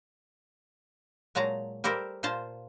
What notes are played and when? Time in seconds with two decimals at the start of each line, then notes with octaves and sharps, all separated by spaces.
1.35 A#2 F#3 G#3 A5 A#5
1.84 G3 G4 A4 A#4 C5
2.23 A#2 F4 C5 A5